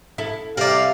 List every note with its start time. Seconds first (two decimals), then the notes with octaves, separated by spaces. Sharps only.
0.18 E4 A4
0.57 C3 G3 A#4 D5 F5